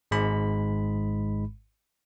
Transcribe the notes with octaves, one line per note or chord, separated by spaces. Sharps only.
G#1 G#2 G#3 B5